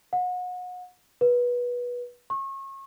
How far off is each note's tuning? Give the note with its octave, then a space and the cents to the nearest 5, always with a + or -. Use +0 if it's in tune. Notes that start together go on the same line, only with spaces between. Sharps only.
F#5 -35
B4 -20
C#6 -35